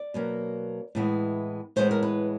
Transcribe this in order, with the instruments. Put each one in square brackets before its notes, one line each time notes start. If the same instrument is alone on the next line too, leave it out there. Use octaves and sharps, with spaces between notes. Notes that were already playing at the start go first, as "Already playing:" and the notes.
Already playing: [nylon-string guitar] D5
B2 F#3 A#3 C#4
A2 E3 G#3 B3
A2 E3 G#3 B3 C5
A#4
B4